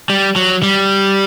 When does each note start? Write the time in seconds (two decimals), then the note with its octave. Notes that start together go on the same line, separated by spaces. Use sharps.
0.10 G3
0.36 F#3
0.63 G3